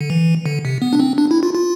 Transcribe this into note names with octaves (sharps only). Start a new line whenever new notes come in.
D3
E3
D3
C3
B3
D4
C4
D4
E4
F4
F4